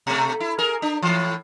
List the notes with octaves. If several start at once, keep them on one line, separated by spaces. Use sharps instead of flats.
B2 A3
E4
G#4 A#4
D4
A2 E3